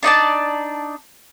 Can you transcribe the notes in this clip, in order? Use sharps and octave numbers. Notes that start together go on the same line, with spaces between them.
D4 D#4 D5 A5